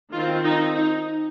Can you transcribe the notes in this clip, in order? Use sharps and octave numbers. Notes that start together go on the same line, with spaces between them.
D#3 C4 F4
D#4
D#4